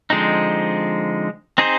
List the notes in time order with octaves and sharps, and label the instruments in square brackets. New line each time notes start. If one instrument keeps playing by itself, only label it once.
[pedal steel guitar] D3 F3 G#3 C4 D#4
C4 D#4 G#4 C5